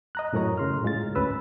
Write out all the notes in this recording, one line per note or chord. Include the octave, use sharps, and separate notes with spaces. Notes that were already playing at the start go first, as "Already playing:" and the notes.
D#5 A#5 F#6
F#2 A2 F#3 A#4 C#5 A#5
C#3 C6 F6
A2 G#3 F4 A6
G#2
D2 C#4 B4 E6